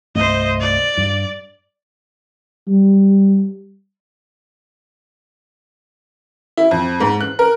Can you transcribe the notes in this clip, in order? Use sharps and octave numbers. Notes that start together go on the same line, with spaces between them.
C2 G2 A3 C5 D#5
D5
G2
G3
E4
F2
G#2
F#6
A#4